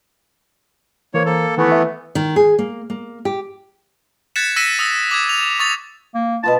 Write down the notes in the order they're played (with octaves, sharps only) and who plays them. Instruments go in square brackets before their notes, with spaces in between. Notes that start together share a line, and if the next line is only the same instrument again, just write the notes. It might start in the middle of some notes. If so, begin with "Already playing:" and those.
[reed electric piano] E3 A#4 C5 [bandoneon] A#3 C#5
[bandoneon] A#3 A4
[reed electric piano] D#3 C#6 [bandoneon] E3 A3 B3
[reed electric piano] E5
[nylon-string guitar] D#3
G#4
A#3
A#3
G4
[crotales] F#6 G#6 A6 B6 C#7 E7
E6 A#6 B6 C#7 D#7 E7
D#6 E6 A#6
D6 D#6 G#6
F7
C#6 D#6 A6 F7
[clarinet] A#3
[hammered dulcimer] B2 B3 F4 [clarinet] A5